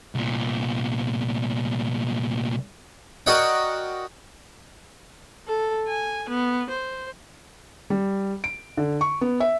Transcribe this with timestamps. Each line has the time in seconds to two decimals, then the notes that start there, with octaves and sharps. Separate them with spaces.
0.15 C2 A#2
3.26 F#4 A#4 D5 D#5 F#5 G5
5.47 A4
5.88 G#5
6.30 B3
6.70 C5
7.90 G3
8.44 D7
8.77 D3
9.01 C#6
9.21 B3
9.40 E5